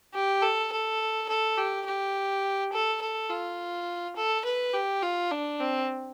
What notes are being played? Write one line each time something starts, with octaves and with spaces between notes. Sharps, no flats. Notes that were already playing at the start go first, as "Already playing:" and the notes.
G4
A4
A4
A4
G4
G4
A4
A4
F4
A4
B4
G4
F4
D4
C4